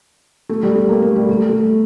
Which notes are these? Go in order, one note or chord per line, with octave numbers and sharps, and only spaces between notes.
A3
G3
A3
A#3
A3
G3
A3
A3